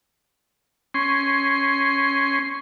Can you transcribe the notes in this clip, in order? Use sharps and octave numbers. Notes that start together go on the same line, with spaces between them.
C#4 C6